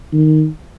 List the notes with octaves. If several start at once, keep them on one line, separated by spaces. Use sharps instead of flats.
D#3